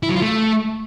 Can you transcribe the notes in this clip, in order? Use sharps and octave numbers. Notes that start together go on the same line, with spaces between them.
E4
F#3
F4
A3